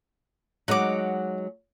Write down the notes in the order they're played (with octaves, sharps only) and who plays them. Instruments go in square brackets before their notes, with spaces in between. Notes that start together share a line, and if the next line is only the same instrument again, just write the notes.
[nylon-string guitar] F#3 G#3 D#4 [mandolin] F#5 D6